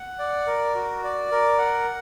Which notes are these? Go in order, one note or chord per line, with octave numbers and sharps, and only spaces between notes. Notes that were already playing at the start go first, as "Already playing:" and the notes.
Already playing: F#5
D5
A#4
F#4
D5
A#4
F#5